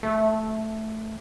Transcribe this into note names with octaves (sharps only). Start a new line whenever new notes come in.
A3